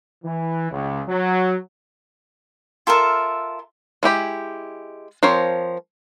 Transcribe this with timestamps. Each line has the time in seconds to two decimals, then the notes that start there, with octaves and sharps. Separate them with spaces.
0.24 E3
0.71 C#2
1.08 F#3
2.87 F4 A4 A#4 E5
4.03 G#3 E4 G4 B5
5.23 F3 C4 A#4 C5 C#5